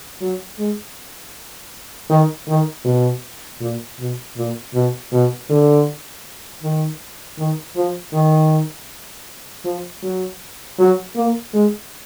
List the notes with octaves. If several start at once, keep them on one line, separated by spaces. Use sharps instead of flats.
F#3
G#3
D#3
D#3
B2
A#2
B2
A#2
B2
B2
D3
D#3
D#3
F3
D#3
F3
F#3
F#3
A#3
G#3